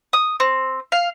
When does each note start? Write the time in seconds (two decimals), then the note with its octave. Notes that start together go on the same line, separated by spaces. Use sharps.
0.13 D#6
0.40 C4
0.92 F5